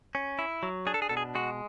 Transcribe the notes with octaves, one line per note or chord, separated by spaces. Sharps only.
C#4
E4
F#3
D4 G#4
A4
G#4
B2 A4
G#4
G#3 F#4